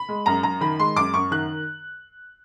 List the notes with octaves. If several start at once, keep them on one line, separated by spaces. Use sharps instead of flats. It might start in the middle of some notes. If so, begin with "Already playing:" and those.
Already playing: B5
G#3
F#2 A#5
F#2 A#5
D#3 B5
G#3 C6
F#2 D6
F#2 C#6
D#3 F#6